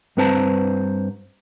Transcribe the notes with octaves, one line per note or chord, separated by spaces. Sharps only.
G2 C4 B4 C5 A5 A#5